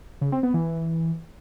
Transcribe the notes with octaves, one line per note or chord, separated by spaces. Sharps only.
C#3
C4
B3
E3